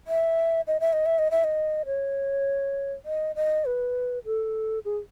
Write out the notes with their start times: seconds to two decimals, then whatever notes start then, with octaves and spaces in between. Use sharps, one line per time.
0.07 E5
0.67 D#5
0.80 E5
0.93 D#5
1.06 E5
1.19 D#5
1.31 E5
1.44 D#5
1.86 C#5
3.05 D#5
3.36 D#5
3.65 B4
4.25 A4
4.85 G#4